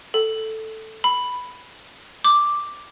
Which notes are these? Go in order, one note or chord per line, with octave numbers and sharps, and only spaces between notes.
A4
B5
D6